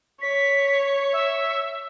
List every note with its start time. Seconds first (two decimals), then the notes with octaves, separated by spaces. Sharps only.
0.22 C#5 B6
1.12 E5